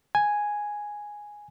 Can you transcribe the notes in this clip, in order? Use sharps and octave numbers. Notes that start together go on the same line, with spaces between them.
G#5